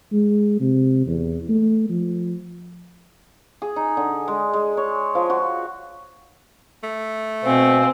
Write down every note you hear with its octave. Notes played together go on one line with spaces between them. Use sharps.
G#3
C3
E2
A3
F3
G#4
D#4
D3
G#3
G#3
C#5
F3
F#4
A3
B2 C4 F5 G#5 E6